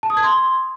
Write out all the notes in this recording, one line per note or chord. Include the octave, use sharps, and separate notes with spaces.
A5
D#6
G#6
C6